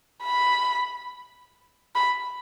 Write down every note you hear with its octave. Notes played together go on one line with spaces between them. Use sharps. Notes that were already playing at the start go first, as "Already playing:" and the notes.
B5
B5